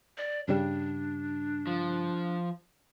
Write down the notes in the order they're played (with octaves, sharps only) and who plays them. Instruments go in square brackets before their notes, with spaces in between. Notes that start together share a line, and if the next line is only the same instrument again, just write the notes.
[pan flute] D5
[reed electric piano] G2 C#3 G3 [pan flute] D4
[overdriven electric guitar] F3